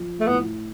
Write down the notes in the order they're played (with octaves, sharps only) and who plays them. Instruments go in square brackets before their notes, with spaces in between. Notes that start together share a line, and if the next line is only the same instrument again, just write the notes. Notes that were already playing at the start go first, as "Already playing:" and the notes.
Already playing: [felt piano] F3
[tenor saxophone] A3
[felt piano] A2 [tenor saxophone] B3